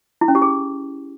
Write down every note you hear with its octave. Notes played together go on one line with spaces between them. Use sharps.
E4
C#4
G4
G#4